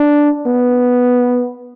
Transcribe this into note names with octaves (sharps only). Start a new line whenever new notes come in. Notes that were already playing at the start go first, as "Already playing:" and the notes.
Already playing: D4
B3